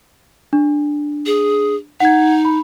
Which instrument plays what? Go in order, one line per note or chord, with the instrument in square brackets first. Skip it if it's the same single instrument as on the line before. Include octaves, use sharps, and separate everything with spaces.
[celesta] D4
[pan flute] G#4
[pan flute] D#4 [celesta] F#5 G#6
[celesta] B5